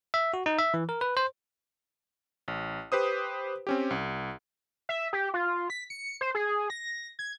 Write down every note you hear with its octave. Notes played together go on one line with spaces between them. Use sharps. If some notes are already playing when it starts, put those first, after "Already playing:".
E5
F#4
D#4
E5
E3
A#4
B4
C5
A1
G4 B4 C5 D#6
C4 C#4 G4
C2
E5
G4
F4
B6
C#7
C5
G#4
A#6
G#6